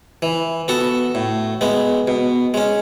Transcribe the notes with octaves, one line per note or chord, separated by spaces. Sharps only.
E3
B3 F#4 A4
A2
G#3 B3
B2
G#3 C#4